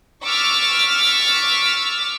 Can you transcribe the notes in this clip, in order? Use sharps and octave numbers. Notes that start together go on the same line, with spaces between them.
C#6 D6 E6 F6 A6 B6